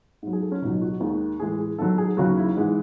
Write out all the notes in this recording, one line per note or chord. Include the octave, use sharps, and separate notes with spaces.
G#2 F#3
G#4
A4
C#4
C#2 B2 F#3 D#4
F#4
D#2 D#3 G#3
A2 E3 G#3 G#4
G#4
G#2 D#3 F#3 A4
G#4
D#2 C#3 F#3 F#4
E4
G#2 E3 G#3